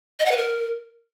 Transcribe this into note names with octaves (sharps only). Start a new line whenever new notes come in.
D#5
F#5
B4
A#4